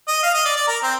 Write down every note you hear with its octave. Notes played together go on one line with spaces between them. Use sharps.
D#5
F5
D#5
D5
D5
A#4
C4